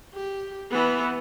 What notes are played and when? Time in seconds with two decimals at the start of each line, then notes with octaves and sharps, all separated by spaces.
0.14 G4
0.71 E3 B3